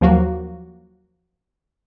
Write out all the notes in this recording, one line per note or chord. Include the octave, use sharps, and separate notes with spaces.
D#2 F3 F#3 A#3 F#4